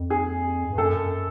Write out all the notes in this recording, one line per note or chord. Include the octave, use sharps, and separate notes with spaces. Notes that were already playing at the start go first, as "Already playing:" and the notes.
Already playing: F2
G#4
G2
F#2 A4